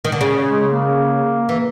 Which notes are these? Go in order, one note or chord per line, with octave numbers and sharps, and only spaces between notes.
D#3
D3
C#3
G#3
A#3
E3